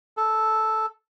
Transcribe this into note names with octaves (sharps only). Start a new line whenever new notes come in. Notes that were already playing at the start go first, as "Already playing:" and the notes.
A4